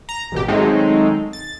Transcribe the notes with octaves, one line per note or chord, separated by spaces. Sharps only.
A#5
A1 B2 G4
D#3 F#3 G#3 A3 C4 D#4
A6